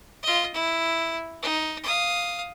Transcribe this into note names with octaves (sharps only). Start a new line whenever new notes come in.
F4 D#5
E4
D#4
F5 D#6